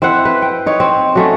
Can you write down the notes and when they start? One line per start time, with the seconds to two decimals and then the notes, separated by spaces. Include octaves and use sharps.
0.02 C4 E4 C5 F#5
0.25 B4
0.42 G5
0.66 D#4 C#5
0.80 C4
1.15 F#3 A3 C#4